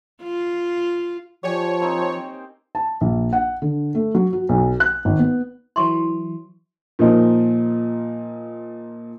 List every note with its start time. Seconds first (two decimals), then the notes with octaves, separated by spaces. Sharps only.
0.23 F4
1.43 F3 G4 C#5 D5 G#5
1.80 A#3 C4 D#4
2.75 A5
3.01 A#1
3.33 F#5
3.62 D3
3.95 A3
4.15 F#3
4.33 F#4
4.49 B1
4.80 F#6
5.05 G#1
5.19 B3
5.76 E3 F#3 E4 C6 C#6
6.99 A#2 F3 D#4 A#4